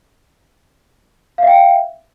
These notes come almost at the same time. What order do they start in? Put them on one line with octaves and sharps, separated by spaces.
F5 E5 G5